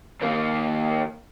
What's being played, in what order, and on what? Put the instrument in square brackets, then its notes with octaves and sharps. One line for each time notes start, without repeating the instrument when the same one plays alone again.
[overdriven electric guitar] D#2 A#3